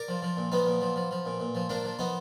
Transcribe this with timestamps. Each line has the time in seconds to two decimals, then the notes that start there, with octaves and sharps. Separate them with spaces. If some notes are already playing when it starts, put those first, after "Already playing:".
Already playing: A#4 D5
0.08 F3
0.22 F3
0.37 A#2
0.52 F3 B3 D#4
0.66 A#2
0.81 F3
0.96 F3
1.11 F3
1.26 A#2
1.40 A#2
1.55 F3
1.69 F3 A#3 D4
1.84 F3
1.99 F3 B3 D#4